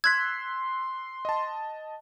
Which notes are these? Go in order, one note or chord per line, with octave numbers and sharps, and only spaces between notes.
C6 E6 F#6 G#6 B6
D#5 A5